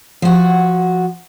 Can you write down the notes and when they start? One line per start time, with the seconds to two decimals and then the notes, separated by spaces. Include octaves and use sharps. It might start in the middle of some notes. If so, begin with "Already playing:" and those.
0.22 F3 F#4